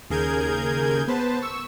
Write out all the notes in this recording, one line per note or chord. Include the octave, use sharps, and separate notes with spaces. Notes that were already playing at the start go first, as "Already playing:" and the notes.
D#2 C#3 G#4 A#4 G6 G#6
B3 B4 C5 A5
C#6 E6